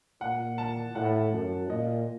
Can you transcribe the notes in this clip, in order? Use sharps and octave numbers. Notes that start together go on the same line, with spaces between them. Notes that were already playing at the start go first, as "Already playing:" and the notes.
A#2 F#5
A5
A2 F#5
F#2
A#2 D#5